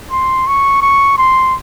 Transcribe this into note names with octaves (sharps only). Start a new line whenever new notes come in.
C6
C#6
C#6
C6